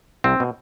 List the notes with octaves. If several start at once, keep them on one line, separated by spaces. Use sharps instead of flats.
C2 C4
B2